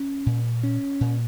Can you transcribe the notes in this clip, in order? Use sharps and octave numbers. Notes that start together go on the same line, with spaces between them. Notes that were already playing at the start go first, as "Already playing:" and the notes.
Already playing: C#4
A#2
C#4
A#2